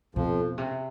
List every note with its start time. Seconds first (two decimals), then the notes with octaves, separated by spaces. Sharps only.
0.15 F2 B2 F3
0.58 C3